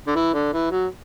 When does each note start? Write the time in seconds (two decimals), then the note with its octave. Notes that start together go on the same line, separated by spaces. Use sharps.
0.07 D3
0.16 E3
0.34 D3
0.53 E3
0.71 F#3